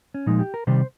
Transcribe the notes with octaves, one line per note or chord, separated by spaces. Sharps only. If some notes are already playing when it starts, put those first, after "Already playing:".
C#4
A#2 F3 G#3 D#4
G4
A#4
C3 D#3 G3 C5